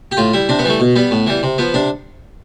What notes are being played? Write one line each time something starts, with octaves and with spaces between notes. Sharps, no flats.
G4
A2 F4
G3 E4
C3 D4
B3
E3 G3 A3
B2
G3 B3
A2
E3 G3
C3
F3 B3
C3 D4